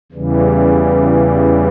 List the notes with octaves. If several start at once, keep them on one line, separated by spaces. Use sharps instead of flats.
E2 C#3 E3 G3